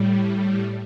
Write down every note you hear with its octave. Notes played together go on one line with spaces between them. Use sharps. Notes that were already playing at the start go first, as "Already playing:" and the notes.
Already playing: A2 G3